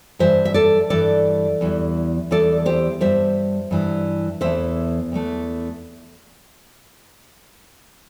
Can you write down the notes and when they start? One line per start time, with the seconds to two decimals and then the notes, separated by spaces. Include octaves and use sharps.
0.19 G2 E3 G3 C5 E5
0.45 E5
0.54 A4 D5
0.90 G2 E3 G3 A4 D5
1.61 E2 E3 G3
2.31 E2 E3 G3 A4 D5
2.66 G4 C5
3.01 G2 E3 G3 C5 E5
3.71 G2 E3 G3
4.41 E2 E3 A3 C5 E5
5.12 E2 E3 A3